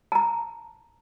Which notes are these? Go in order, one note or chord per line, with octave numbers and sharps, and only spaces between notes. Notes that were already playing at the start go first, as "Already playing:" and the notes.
A5 A#5